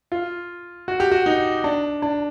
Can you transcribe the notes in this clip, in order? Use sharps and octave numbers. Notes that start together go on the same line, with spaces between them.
F4
F#4
G4
F#4
D#4
D4
D4